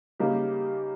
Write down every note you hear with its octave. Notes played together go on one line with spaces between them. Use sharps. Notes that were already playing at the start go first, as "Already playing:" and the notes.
C#3 G3 A#3 D#4 G4